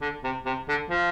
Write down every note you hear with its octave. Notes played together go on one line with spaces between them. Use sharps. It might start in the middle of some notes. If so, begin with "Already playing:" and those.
D3
C3
C3
D3
F3